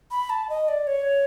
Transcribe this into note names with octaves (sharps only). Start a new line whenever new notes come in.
B5
A5
D#5
D5
C#5